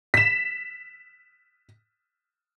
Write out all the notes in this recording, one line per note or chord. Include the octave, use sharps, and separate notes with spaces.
B6 E7